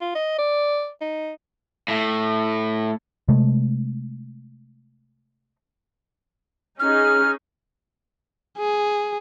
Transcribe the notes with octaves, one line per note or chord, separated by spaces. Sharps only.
F4
D#5
D5
D#4
A2
C3 G#3 A3
C#4 D#4 G#4 F6
G#4